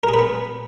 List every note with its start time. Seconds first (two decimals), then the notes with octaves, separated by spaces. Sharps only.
0.03 A#4
0.09 G#4
0.14 B4
0.19 B3